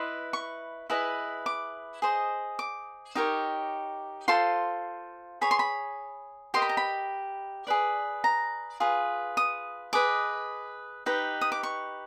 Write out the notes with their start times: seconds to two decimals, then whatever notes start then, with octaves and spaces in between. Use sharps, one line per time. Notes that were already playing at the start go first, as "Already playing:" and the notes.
Already playing: E4 B4 D#5 C6
0.33 C#6
0.90 E4 G#4 B4 D#5
1.46 D6
2.02 G#4 C5 D#5
2.59 D6
3.15 D#4 G4 A#4 C#5
4.28 F4 A4 C5 C6
5.41 G#4 C#5 B5
5.51 C6
5.59 B5
6.54 G4 A#4 D#5 C6
6.62 B5
6.69 A#5
6.77 B5
7.67 G#4 B4 D5
8.24 A#5
8.80 F4 G#4 B4
9.37 D#6
9.93 G#4 B4 D#5 D6
11.06 D#4 G4 B4
11.41 D#6
11.52 D6
11.63 C#6